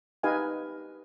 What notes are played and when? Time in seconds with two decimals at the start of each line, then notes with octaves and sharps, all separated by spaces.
0.23 D#4 G4 B4 D#5 F5 G#5